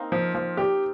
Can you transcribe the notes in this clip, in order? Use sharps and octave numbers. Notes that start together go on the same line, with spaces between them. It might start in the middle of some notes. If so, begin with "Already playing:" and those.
Already playing: A#3 C4 D#4
F3
F3
G4